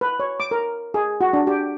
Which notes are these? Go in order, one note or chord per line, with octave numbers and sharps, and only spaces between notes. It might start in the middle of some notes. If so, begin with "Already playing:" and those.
B4
C#5
D6
A#4
G#4
F#4
D4
G4